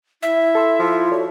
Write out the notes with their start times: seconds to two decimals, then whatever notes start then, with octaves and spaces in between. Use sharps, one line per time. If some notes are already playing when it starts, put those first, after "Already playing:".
0.23 E4 E5
0.55 A4 C6 E6
0.80 F3
1.12 F#4 A4 C#5 D5